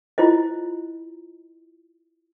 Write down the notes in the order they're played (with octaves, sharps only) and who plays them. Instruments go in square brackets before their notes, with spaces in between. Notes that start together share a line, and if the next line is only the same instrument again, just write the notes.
[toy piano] E4 F4 C5 D#5